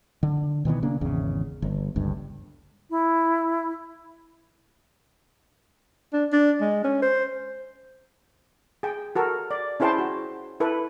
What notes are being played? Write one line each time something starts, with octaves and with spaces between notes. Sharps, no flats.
D3
B2 D#3 E3 B3
C#3 A#3 D4
G#1 E2 C#3
G1
G1 C#2 G2
E4
D4
D4
G#3
C#4
C5
G#4 G5
F#4 A4 A#4
D5
C#4 E4 G#4 C5 G5 A5
F#4
E4 A4 B4